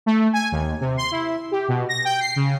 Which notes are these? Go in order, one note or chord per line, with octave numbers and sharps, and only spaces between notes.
A3
G#5
D#2
C3
C6
E4
G4
B2
A#6
G5
C7
C#3